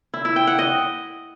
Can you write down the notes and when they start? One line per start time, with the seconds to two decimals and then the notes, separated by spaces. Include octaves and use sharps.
0.14 E4
0.25 E4
0.36 G5
0.47 F#5
0.59 D#5